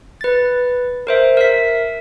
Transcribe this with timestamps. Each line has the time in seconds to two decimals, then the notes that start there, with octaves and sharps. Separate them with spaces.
0.21 B4 A6
1.07 A#4 C5 E5
1.37 A#4 E5 B6